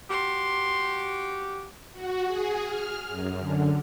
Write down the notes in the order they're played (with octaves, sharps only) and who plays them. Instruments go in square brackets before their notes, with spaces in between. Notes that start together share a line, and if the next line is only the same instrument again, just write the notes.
[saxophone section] F#4 G4 [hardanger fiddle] C6
[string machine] F#4
G#4
F6
F#2
D3